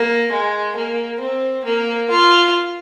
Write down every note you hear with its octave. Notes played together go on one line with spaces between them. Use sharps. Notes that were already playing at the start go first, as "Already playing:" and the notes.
Already playing: A#3
G#3
A#3
C4
A#3
F4